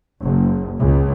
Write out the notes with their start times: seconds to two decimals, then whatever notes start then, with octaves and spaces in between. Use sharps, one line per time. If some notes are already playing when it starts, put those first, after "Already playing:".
0.21 F#1
0.78 C#2